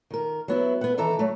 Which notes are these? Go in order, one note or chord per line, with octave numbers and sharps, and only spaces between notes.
D#3 A#4
F#3 B3 E4
B3 F#5
D#3 E3 A4 E5 A#5
F#3 A3